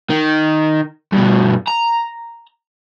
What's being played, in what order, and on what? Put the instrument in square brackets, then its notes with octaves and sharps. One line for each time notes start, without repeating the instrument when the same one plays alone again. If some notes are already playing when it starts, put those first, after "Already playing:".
[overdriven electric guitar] D#3
G2 B2
A#5